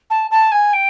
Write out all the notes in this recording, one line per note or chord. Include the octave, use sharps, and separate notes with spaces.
A5
A5
G#5
G5